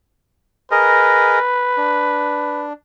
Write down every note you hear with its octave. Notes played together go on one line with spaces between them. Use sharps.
G#4 A#4 B4 D#5
D4